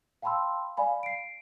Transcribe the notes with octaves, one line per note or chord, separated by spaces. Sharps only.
F5 G5 A5 B5 C6 E6
D5 F5 G#5 B5
C7 D7